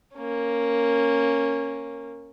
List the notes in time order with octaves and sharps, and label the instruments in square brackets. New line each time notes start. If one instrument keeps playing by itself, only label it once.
[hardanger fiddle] A#3 C#4